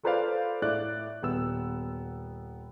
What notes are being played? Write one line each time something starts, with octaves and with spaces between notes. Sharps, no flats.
F4 A4 B4 C5 D5 F5
A2 D5 F#6
D#1 B3 E6